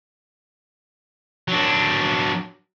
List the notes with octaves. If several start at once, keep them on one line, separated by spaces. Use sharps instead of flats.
F#3 D4